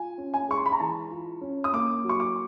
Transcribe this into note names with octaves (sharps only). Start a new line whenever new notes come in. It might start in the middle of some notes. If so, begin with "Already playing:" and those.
Already playing: F4 G#5
C#4
G#5
G#3 C#6
C6
B5
A#5
E3 A5
F4
C#4
D#6
A#3 D6
F#3
C#6
D6